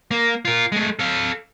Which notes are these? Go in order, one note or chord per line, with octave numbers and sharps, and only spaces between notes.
A#3
F4 A#4
G#3 A3
A4 F5